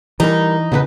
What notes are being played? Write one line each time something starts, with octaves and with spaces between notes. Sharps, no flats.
E3 G3 D#4 A#4
E2 C#3 E4 B4